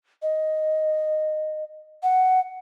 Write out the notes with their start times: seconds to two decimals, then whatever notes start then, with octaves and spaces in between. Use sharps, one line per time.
0.22 D#5
2.03 F#5